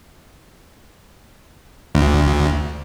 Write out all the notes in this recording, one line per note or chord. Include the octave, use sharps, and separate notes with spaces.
D2